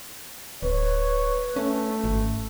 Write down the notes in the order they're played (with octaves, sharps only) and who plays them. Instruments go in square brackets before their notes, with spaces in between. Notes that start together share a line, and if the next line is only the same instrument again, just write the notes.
[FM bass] D1 [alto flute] B4 [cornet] C#5
[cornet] A3 [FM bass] C#4
[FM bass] G#1